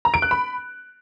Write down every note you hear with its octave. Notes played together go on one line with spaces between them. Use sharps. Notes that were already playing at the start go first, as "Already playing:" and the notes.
A#5
D7
F#6
B5